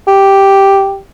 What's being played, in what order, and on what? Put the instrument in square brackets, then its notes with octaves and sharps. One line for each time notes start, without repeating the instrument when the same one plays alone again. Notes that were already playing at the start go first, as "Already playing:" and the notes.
[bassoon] G4